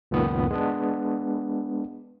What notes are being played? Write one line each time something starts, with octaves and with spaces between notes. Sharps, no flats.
C#2 F#2 A#2 D#3 B3
G#3 B3 D4